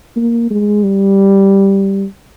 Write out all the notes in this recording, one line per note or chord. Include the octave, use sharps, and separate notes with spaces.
A#3
G#3
G3